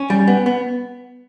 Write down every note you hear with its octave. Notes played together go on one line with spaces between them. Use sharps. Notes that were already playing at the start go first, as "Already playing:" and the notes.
Already playing: C#4
G3
B3
B3